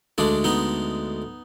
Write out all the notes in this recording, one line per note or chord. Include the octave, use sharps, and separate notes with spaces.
D2 D3 G#3 D4
B3 D#4